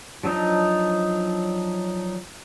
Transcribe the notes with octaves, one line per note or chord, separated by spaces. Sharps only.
F3 F#3 D4 D#4 D#5